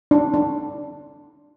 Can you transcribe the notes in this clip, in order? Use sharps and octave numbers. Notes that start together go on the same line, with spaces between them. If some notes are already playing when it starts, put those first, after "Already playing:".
D4
D4